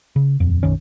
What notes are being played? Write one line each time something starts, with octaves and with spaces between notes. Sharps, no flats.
C#3
D#1 F2
B1 F#2 D#3 C#4